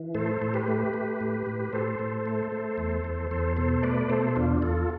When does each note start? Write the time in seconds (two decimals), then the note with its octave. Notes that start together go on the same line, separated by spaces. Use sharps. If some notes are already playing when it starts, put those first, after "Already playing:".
Already playing: E3
0.15 A2 A4 C5
0.41 A2
0.54 G4 B4
0.68 A3
0.94 A3
1.21 A2
1.47 A2
1.73 A2 A4 C5
1.99 A2
2.26 A3
2.52 A3
2.78 E2
3.04 E2
3.31 E2 A4 C5
3.57 B2 A4 C5
3.83 A3 B4 D5
4.09 B2 A4 C5
4.36 E2 D4 F4
4.62 E2 F4 A4